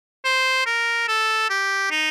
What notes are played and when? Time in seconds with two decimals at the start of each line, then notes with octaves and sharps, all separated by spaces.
0.25 C5
0.66 A#4
1.08 A4
1.50 G4
1.91 D#4